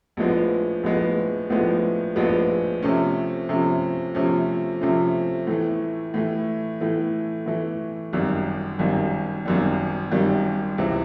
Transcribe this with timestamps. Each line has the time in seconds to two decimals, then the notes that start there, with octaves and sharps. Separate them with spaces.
0.17 A#1 A2 F3 G#3 B3
0.83 A#1 A2 F3 G#3 B3
1.50 A#1 A2 F3 G#3 B3
2.16 A#1 A2 F3 G#3 B3
2.82 C3 F3 A3 C#4
3.49 C3 F3 A3 C#4
4.15 C3 F3 A3 C#4
4.81 C3 F3 A3 C#4
5.47 A2 E3 A3
6.14 A2 E3 A3
6.80 A2 E3 A3
7.46 A2 E3 A3
8.13 G#1 F#2 D#3 G3
8.79 G#1 F#2 D#3 G3
9.46 G#1 F#2 D#3 G3
10.11 G#1 F#2 D#3 G3
10.78 C#2 C3 E3